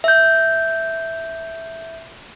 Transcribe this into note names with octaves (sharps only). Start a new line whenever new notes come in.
E5 G6